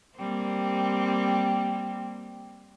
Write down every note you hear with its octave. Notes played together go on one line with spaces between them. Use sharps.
G3 A#3 C4